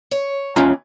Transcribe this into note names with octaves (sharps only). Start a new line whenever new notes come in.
C#5
D#2 E3 C#4 F4 A#5